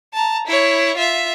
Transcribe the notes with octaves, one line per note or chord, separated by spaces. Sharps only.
A5 A#5
E4 C#5
F4 E5